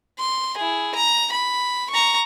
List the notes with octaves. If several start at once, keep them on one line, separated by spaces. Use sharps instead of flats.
C6
E4 G#4
A#5
B5
A#5 C#6